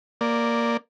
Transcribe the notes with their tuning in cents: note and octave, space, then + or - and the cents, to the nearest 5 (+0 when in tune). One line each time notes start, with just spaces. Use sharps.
A#3 +0 D5 +0